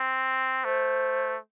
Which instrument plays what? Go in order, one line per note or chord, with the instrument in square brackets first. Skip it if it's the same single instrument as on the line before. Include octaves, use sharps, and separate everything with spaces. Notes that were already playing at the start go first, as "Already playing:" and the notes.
Already playing: [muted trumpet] C4
[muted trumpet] A3 [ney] C5